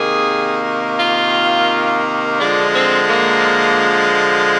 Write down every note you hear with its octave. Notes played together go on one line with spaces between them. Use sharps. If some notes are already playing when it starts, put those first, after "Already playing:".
Already playing: C3 D#3 A#3 G#4
F4
D3 F3 G#3 D4
C4
A#3